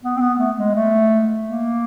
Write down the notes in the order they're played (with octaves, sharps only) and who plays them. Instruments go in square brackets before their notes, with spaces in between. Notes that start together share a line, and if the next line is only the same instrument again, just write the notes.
[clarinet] B3
C4
B3
A3
G#3
A3
A#3